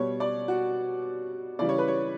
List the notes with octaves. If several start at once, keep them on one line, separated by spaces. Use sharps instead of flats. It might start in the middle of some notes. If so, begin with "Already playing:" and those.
Already playing: B2 G3 C#5
D5
F#4
C#3 E3 G3 D5
C#5
B4
C#5